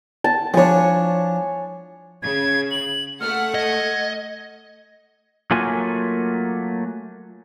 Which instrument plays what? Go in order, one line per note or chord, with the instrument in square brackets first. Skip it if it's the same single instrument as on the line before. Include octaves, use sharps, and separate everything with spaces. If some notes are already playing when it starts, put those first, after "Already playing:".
[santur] A5
[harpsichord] F3 D4 [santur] C#5 G#5
[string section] C#3 [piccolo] G#6
[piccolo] F#7
[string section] A3 F#5 [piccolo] F6
[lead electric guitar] D#5 [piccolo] G#6
[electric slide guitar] F#3 A3 A#3 F4 G#5